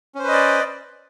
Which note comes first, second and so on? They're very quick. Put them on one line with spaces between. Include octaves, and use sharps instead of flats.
C#4 C5 B4 D#5 D5